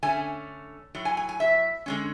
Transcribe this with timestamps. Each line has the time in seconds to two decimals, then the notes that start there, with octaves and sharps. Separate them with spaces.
0.03 D3 A3 C#4 G#5
0.95 A2 F#3
1.05 G#5
1.17 G#5
1.29 G#5
1.40 E5
1.86 D3 G#3 C#4